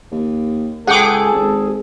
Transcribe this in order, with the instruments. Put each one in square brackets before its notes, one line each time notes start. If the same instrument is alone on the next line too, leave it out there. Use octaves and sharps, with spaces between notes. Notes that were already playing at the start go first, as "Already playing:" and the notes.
[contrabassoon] D#2
[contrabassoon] C#2 [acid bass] G#4 [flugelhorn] A4 [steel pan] F#5 G5 D6
[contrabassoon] G#1